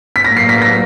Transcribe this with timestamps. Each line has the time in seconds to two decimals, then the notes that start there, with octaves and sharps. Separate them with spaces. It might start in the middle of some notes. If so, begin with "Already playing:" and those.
0.16 B6
0.24 A2 F#3 A#3 A#6
0.37 C7
0.49 B6
0.62 A#6